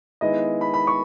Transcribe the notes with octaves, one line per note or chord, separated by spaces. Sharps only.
D#3 G#3 B3 E4 D#5
B5
B5
C#6